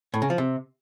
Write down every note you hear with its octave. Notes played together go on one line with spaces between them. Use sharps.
A2
C#3
F3
C3